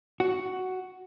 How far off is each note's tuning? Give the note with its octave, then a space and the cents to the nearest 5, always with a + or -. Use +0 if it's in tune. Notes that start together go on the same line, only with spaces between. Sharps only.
F#4 +5